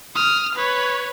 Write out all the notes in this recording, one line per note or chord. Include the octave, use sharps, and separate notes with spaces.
D#6 F6
B4 C#5